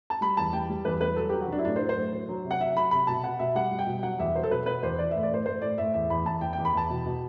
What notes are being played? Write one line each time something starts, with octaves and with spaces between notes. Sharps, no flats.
A5
G3 B5
E2 A5
G3 G5
G3
E2 B4
G3 B4
F#3 A4
F#3 G4
F#4
F#3 D4
E4
A2 D4
C5
F#3
C5
A2
F#3
F#3
C3
F#5
F#3 E5
F#3 B5
C3 B5
B2 A5
B2 F#5
B2 E5
G3 F#5
G3
G5
B2
F#3 F#5
E2 E5
F#3 C5
A4
B2 B4
B2 B4
E2 C5
E3 D5
A2 E5
D5
A2 C5
A2 C5
A2 D5
A2 E5
E2 E5
E2 B5
E2 A5
E2 G5
G5
E2
B5
E2 A5
B2
B2